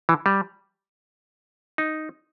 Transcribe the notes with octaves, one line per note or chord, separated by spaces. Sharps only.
E3
G3
D#4